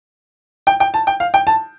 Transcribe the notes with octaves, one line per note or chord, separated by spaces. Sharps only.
G5
G5
A5
G5
F5
G5
A5